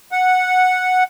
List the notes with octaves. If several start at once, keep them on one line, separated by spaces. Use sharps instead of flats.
F#5